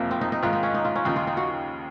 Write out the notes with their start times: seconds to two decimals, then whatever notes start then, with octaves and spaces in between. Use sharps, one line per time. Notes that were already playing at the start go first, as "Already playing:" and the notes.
Already playing: F#1 F2 C3 F3 A#3
0.11 C4
0.21 D#4
0.32 D#4
0.42 G#2 D#3 G#3 F4
0.53 D#4
0.63 C#4
0.74 D#4
0.85 F4
0.95 C#4
1.05 D#2 C#3 F3 D#4
1.16 F4
1.27 D#4
1.37 F#4